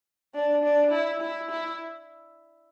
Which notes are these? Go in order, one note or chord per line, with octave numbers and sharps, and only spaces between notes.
D4
D4
E4
E4
E4